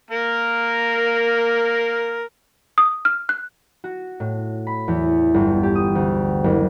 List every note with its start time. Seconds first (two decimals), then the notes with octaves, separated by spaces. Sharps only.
0.11 A#3 A#4
2.78 D#6
3.05 F6
3.29 F#6
3.84 F#4
4.20 A2
4.67 B5
4.88 E2
5.34 G1
5.63 G4
5.75 D#6
5.95 D2
6.44 F#1